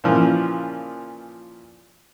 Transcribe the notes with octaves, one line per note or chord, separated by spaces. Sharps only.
A#2 C#3 E3 F3